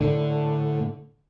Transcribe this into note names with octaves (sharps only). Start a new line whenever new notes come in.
A2 D3